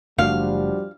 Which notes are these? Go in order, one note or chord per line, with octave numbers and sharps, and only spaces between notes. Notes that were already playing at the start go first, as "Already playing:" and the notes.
F#1 F3 G3 A3 D4 F#4 F5